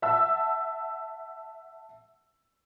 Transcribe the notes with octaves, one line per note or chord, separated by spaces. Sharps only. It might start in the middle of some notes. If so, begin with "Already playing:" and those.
E5 F#5 A5 E6